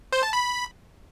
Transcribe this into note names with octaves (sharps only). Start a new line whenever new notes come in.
C5
A5
B5